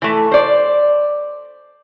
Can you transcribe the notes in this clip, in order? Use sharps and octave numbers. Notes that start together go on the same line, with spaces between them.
E3 A3
C5 D5